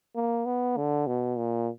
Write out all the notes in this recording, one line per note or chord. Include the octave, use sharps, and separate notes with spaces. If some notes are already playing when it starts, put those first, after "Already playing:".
A#3
B3
D3
B2
A#2